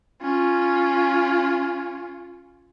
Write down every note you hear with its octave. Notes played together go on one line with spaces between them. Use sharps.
C#4 F4